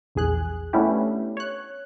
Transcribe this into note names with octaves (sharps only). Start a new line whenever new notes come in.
A#1 E2 G#4 F#6
A3 B3 C#4 D4 E4 G4
C#5 F#6